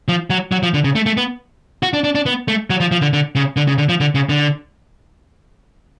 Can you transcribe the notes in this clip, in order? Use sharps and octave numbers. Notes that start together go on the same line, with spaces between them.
F3
F#3
F#3
F3
D3
C#3
A3
A3
B3
F#4
D4
D4
D4
B3
A3
F#3
F3
F3
D3
D3
C#3
D3
C#3
D3
F3
D3
C#3
D3